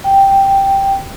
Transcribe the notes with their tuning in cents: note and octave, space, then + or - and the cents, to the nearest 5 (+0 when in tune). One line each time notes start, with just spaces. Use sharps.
G5 +0